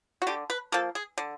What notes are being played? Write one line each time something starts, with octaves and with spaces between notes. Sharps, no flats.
F#4
D3 G4
B4
F3 A#3 A4
G#4
D3